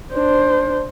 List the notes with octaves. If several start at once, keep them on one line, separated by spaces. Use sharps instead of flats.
D4 C5